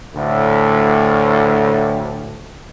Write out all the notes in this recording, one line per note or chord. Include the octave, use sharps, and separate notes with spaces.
D2 A2